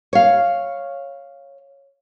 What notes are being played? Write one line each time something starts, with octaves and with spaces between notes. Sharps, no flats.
C#5 F5